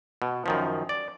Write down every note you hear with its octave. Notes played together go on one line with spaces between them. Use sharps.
B2
F#2 D#3 F3
D5